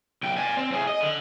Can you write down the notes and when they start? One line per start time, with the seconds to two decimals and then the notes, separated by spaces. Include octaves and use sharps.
0.23 B1 G5
0.37 D5 G#5
0.57 C4
0.72 A2 G#4
0.87 D#5
1.01 D3